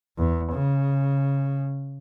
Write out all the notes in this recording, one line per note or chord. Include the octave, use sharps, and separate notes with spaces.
E2
C#3